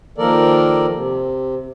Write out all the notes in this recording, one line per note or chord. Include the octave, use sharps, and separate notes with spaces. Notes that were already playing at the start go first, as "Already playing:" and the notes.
D#3 F3 A#3 A4 A#4 D5
C3